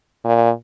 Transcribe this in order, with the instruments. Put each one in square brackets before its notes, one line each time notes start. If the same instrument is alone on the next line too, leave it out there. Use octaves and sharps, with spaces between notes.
[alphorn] A#2